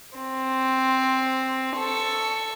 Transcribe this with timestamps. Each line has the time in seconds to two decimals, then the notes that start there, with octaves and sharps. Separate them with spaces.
0.18 C4
1.77 A4 C#6